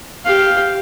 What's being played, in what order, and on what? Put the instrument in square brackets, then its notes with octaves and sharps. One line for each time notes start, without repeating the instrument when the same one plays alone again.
[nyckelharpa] G4 F5